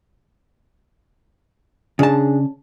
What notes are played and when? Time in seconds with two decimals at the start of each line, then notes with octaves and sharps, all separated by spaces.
1.99 C#3 D4 G#4 A5